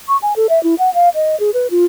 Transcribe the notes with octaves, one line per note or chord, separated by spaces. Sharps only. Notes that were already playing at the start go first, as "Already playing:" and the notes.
C#6
G#5
A4
E5
E4
F#5
F5
D#5
G#4
B4
F4